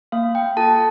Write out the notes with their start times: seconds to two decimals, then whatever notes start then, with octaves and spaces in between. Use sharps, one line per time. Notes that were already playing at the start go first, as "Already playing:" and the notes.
0.12 A#3 F5
0.35 G5
0.57 F4 A4 A5